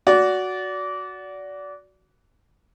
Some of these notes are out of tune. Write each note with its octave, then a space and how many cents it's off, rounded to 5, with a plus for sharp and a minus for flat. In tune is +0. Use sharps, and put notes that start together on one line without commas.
F#4 +0 D5 -25